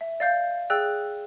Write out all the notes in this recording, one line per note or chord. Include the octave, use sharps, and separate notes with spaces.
E5
D5 F5 G6
G#4 D5 G5 E6 F#6